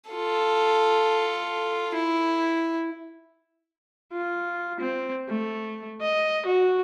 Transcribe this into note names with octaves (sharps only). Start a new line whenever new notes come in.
F4 A4
E4
F4
C4
A3
D#5
F#4